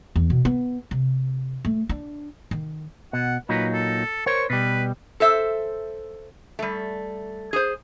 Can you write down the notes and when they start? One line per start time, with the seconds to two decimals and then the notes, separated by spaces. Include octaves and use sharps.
0.16 E2
0.30 B2
0.45 B3
0.91 C3
1.65 A3
1.89 D4
2.51 D#3
3.13 B2 F#5
3.49 A#2 F#3 D#4 B4
3.73 A4
4.26 A#4 C5 C#5 C#6
4.50 B2 G3 B4
5.20 A4 C5 E5
6.59 G3 A3
7.53 G#4 C5